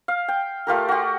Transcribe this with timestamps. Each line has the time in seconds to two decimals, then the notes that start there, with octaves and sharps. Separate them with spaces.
0.08 F5
0.28 G5
0.67 A3 F4 G4 A#4
0.89 F#4 G4